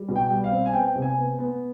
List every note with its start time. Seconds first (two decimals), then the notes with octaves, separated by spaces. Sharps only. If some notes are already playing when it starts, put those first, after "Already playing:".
Already playing: G3
0.09 B2
0.16 G5
0.30 G3
0.44 F5
0.52 C4
0.66 G#5
0.73 B3 G5
0.95 C3
1.02 G#5
1.17 B3
1.39 B3